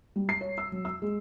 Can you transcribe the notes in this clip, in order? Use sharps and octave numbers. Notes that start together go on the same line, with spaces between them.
G3
C7
C#5
E6
F#3
E6
G#3